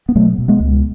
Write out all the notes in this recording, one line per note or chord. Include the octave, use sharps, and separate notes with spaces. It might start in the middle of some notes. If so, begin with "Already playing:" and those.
B3
B2 F#3 A3
B2
G#3 B3
C#2